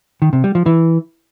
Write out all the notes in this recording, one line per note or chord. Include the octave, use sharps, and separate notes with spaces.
D#3
C3
G3
F3
E3